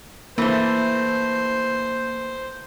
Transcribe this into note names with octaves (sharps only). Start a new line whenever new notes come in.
E3 A3 A#3 C5